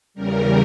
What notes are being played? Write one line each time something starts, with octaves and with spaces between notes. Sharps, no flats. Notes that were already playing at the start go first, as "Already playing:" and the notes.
E2 C#3 G3 A#4